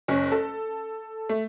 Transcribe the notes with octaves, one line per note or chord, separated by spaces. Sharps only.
F#1 C#4
A4
A3